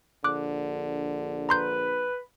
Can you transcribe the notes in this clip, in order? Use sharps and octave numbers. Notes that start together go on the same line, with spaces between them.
A#1 D3 D6 F#6
B4 A#5 C6 G6